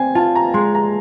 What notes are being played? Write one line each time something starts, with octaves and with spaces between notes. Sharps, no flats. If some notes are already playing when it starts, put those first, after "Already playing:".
Already playing: C4 G5 G#5
F4 A5
A#5
G#3 C6
A#5